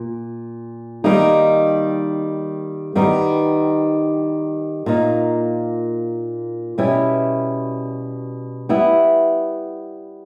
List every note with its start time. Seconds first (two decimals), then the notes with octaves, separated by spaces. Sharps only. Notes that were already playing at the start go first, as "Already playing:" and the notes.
Already playing: A#2
1.04 D#3 G3 A#3 D#4
2.95 D#3 G3 B3 D#4
4.86 A#2 A#3 D#4
6.78 B2 G3 C#4 E4
8.69 G3 B3 E4